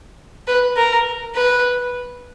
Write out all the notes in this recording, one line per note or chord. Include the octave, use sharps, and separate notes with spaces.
B4
A#4
B4